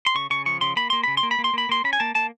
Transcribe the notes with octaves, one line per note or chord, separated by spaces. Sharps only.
C6
C#3 C#6
C#3 C#6
F3 C#6
C#3 C6
A#3 B5
A#3 C6
C#3 B5
C6
A#3
B5
A#3
C6
A#3 B5
A#3 C6
C#4 B5
G#5
A#3 A5
A#3 A5